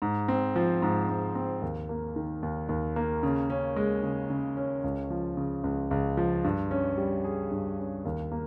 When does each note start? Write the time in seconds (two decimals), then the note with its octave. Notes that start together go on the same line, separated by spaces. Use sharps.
0.02 G#2
0.28 C4
0.56 F3
0.82 G#2
1.09 G#2
1.35 C4
1.62 D#2
1.89 A#3
2.16 D#3
2.43 D#2
2.69 D#2
2.96 A#3
3.23 C#3
3.50 C#4
3.76 G#3
4.03 C#3
4.30 C#3
4.57 C#4
4.84 C#2
5.10 F3
5.37 C#3
5.64 C#2
5.91 C#2
6.17 F3
6.44 G2
6.71 C#4
6.98 G3
7.24 G#4
7.51 G2
7.78 C#4
8.05 D#2
8.32 A#3